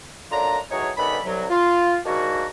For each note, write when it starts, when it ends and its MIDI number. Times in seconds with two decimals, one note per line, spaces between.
0.31 0.58 42
0.31 0.58 50
0.31 0.58 62
0.31 0.58 65
0.31 0.58 82
0.71 0.90 45
0.71 0.90 52
0.71 0.90 54
0.71 0.90 63
0.71 0.90 68
0.71 0.90 73
0.97 1.19 43
0.97 1.19 51
0.97 1.19 59
0.97 1.19 61
0.97 1.19 69
0.97 1.19 83
1.25 1.45 36
1.25 1.45 54
1.50 1.98 65
2.06 2.46 44
2.06 2.46 51
2.06 2.46 58
2.06 2.46 62
2.06 2.46 66